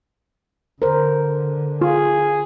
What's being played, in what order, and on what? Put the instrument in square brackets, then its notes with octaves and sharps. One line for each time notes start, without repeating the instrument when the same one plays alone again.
[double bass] D3 [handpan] A#4 C5
[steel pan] F4 [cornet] G#4